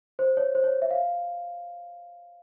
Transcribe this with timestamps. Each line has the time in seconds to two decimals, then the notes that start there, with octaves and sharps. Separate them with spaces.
0.19 C5
0.37 C#5
0.55 C5
0.64 C#5
0.82 E5
0.91 F5